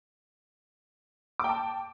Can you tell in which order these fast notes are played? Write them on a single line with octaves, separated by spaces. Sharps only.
D6 G5 A5